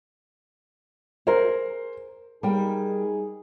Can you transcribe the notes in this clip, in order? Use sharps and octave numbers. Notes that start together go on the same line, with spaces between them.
G#4 A#4 C5
G3 D#4 G#4 A#4 G5